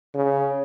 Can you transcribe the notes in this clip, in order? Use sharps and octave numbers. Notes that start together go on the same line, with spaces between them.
C#3